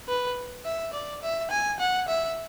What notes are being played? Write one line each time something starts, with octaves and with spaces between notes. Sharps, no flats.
B4
E5
D5
E5
G#5
F#5
E5